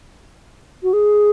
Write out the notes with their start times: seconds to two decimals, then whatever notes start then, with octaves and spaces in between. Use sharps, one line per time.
0.83 F#4
0.93 G#4